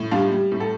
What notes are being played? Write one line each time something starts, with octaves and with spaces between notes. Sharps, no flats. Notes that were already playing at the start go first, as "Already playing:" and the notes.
Already playing: A2
G3 D4 F4
G3
A2
A4